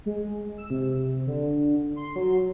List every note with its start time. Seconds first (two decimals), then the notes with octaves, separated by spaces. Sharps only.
0.06 G#3
0.58 E6
0.70 C3
1.27 D3
1.96 C6
2.16 F#3